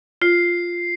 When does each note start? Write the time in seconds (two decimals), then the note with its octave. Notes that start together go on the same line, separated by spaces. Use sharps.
0.22 F4 C7